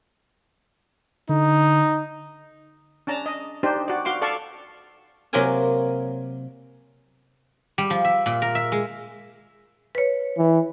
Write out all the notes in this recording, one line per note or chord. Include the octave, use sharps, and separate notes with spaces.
D3 D#4
C#4 D4 A5 A#5
D#5
D4 D#4 G4 C5
F#4 D5
F#4 F5 C6 D6
A4 D5 F5 A5 C#6
C3 F#3 A#3 F4 A#4 G#5
G3
F3
E5
A#2
A#4
E5
G#3
B4 C#5
E3